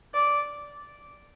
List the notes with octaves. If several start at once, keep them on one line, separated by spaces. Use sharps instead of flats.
D5